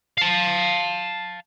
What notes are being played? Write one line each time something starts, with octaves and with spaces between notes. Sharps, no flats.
F5 A5